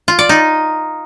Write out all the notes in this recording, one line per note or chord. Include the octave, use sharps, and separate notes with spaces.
F4
D5
D#4